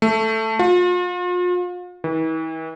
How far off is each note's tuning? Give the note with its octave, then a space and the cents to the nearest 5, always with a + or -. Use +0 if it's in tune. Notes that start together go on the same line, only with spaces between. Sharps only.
A3 +5
F4 +40
E3 -45